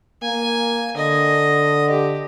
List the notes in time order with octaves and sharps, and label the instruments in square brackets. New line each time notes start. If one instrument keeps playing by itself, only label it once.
[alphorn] A#3 [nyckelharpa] G#5
[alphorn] D3 [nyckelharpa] D#5
[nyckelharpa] G4